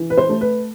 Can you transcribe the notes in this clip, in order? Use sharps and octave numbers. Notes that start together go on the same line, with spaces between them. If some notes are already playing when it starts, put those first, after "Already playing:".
Already playing: E3
B4
C5
A3
B4